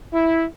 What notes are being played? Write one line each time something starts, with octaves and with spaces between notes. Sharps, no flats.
E4